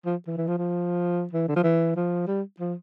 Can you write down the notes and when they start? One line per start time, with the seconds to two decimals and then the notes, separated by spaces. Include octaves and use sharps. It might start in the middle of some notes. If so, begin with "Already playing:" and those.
0.06 F3
0.27 E3
0.37 E3
0.47 F3
0.58 F3
1.33 E3
1.48 D3
1.56 F3
1.64 E3
1.96 F3
2.27 G3
2.60 F3